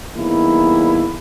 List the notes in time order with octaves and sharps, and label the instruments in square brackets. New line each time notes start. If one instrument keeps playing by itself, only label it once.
[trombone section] E2 G2 A#3 D#4 E4